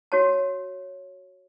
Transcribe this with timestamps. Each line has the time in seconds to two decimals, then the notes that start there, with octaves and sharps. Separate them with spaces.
0.12 F#4 C#5 A5